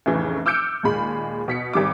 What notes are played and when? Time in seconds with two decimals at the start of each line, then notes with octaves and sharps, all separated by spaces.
0.06 F1 A2 C#3 E3
0.46 D6 E6 F6 G6 C#7 D7
0.83 D#2 A#2 G#3 B5
1.48 B2 B6 C#7
1.73 G#1 G3 D6